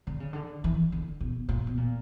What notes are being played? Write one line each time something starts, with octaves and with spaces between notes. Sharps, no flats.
D3
C#3
D3
E3
D3
B2
A#2
B2
A#2